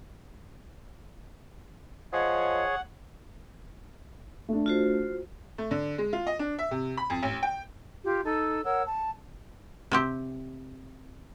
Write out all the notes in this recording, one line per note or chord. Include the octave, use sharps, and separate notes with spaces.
F3 G#4 C#5 D#5 F#5
A3 D4
F4 F#4 C5
A3
D3
G#3
F4
D#5
D4
E5
C3
B5
F2
A1
G5
F4 G4
D#4 A4 E6
A#4 C#5 F#5 E6
A5
C3 C4 G4